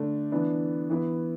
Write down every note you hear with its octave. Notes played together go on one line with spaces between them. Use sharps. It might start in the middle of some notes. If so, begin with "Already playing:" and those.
Already playing: D3 A3 D4
E3 B3 D4
E3 B3 E4